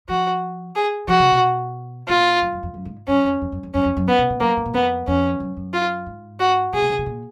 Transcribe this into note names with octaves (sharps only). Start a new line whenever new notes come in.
F3 F#4
G#4
F3 F#4
C#3
B2
A#2 F4
F#2
F#2
F2
F#2
G#2
F#2 C#4
F2
F2
F#2
F2
F#2 C#4
F2
F#2
G#2 B3
B2
A#2
F#2 A#3
G#2
A#2
F2 B3
F2 C#4
F#2
F#2
F4
G#2
F#4
A#2 G#4
B2
C#3
B2
A#2